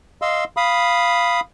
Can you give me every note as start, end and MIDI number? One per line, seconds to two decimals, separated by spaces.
0.22 0.44 75
0.22 0.44 77
0.22 0.44 84
0.22 0.44 88
0.57 1.40 77
0.57 1.40 83
0.57 1.40 87